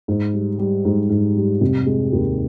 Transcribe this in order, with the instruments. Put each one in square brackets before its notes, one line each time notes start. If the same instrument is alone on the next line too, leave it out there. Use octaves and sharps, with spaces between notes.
[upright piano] G#2
G3
G3
G#2
G#2
G3
F1
G#3
D#2